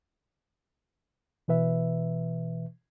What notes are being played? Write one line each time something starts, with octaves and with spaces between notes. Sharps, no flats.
B2 E3 B4 E5